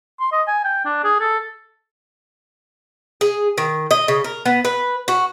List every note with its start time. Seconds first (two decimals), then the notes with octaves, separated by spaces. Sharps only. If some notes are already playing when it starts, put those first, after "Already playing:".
0.20 C6
0.32 D#5
0.48 G#5
0.65 G5
0.86 D4
1.04 G#4
1.21 A4
3.21 G#4
3.58 D#3
3.91 D#5
4.08 C#3
4.24 A#4
4.46 B3
4.65 B4
5.08 F#4